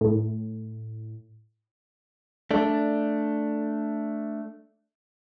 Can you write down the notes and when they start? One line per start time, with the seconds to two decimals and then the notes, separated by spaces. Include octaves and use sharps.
0.01 A2
2.51 A3 D4